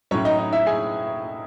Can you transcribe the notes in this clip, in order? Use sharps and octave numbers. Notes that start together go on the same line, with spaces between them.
A2 F#3 C#4 C#5
D#4 D#5
D#4 D#5
E4 E5
G#4 G#5